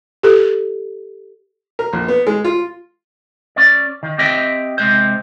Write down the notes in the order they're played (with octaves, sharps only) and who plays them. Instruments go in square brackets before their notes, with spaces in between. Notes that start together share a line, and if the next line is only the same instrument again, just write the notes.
[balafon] G4 A4
[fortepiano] A#4
A#1
B3
G#3
F4
[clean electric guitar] C#4 D5
D#3
C4 G4 D#5 E5 G5
C3 G#3 C5